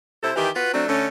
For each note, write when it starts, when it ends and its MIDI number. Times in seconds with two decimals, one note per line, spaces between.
0.23 0.31 48
0.23 0.31 64
0.23 0.31 69
0.23 0.31 72
0.36 0.49 51
0.36 0.49 52
0.36 0.49 67
0.55 0.72 65
0.55 0.72 66
0.55 0.72 71
0.73 0.84 54
0.73 0.84 57
0.73 0.84 60
0.73 0.84 62
0.88 1.07 50
0.88 1.07 57
0.88 1.07 61